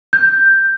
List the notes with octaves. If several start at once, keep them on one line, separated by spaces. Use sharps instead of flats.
G6